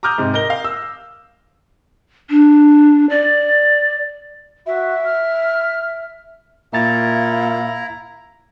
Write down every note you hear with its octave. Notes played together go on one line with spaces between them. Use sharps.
A#5 D6 D#6 F6 G6
G#2 C3
A#4 D#5 A#6 G7
F5
E6
D4
D5
F#4 E5
F6
A#2 E4 E5 F5 A#5 A6